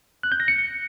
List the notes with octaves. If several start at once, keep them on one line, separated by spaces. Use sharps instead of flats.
F#6
G6
A#6
C#7